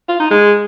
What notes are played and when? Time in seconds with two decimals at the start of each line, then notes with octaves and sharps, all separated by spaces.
0.09 F4
0.20 D#4
0.31 G#3